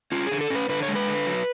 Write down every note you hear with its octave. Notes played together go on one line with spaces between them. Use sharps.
C#4 F4
G#4
D3
A4
C#4 B4
D3 B4
C#5
G#3
B4
D3
F#3